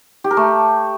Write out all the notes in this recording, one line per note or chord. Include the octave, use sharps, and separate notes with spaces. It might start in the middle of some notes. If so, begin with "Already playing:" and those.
G4
A#4
A3